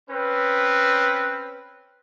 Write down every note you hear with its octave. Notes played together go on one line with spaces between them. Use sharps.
C4 C#4 B4